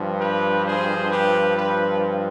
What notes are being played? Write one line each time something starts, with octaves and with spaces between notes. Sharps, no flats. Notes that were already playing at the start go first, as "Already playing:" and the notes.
Already playing: G2 F3
G4 B4
G#4 C5
G4 B4
G4 B4